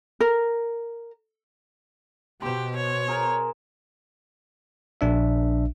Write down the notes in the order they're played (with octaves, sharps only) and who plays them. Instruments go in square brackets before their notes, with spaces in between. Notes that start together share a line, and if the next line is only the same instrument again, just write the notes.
[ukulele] A#4
[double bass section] B2 [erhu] G4 [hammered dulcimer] C5 C6
[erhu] C#5
[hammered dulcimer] G#4 A#4 C5
[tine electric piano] A#1 D4 E5